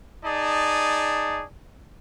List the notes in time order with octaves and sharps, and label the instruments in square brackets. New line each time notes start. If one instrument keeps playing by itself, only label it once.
[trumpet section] D#4 G#4 D5 A5